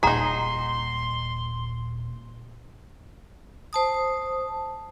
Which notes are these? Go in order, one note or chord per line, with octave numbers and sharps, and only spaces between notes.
D#1 A#2 D#4 G#4 F#5 A#5 C6
C5 A5 D#6